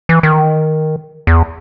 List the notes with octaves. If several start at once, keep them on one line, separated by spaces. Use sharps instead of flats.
E3
D#3
E2